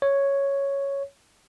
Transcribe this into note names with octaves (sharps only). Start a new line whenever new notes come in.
C#5